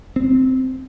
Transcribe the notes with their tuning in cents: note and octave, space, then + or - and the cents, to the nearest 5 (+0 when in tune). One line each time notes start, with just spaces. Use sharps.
C4 -10